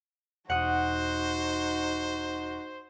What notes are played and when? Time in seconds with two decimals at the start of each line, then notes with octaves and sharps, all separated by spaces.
0.50 E1 D#4 F#4 C5 F#5 D#6